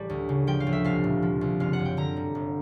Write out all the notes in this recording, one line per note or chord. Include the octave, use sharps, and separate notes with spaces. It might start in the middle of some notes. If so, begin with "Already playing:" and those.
Already playing: A1 G3 D5
D2
C#3
F3 G5
F5
D2
E5
C2 F5
A#2
F3
C2
F#1 F5
F#5
F#2
G5
D3 A#5
G3
G1